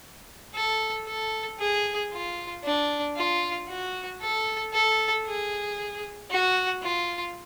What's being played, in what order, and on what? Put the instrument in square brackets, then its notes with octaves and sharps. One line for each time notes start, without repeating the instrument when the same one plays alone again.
[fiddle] A4
A4
G#4
F4
D4
F4
F#4
A4
A4
G#4
F#4
F4